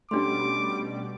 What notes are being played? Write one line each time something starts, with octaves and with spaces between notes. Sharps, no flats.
B2 G3 A3 C#4 D4 G4 C6 D6